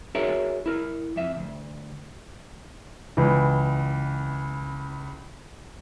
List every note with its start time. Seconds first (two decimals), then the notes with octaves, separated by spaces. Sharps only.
0.15 D#4 F#4 G#4 A#4 C#5 E5
0.66 E4 A#4
1.16 F2 E5
1.37 D2
3.17 C#2 E3